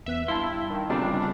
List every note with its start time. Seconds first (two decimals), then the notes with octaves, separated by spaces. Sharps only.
0.06 E2 B3 E5 F#6
0.28 G2 E4 F5 A5 C6
0.70 D#3
0.90 G1 C#2 C#3 G3 C4 D4